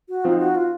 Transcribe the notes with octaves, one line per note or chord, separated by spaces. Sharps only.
F#4
F3 C4 D#4 F4
F#4
F4